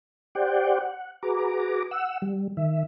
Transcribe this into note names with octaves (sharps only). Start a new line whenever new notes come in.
G4 C5 D5 F#5 G5
F#5
F#4 G#4 B4 A#5 D6
F#5 E6
G3
D#3 E5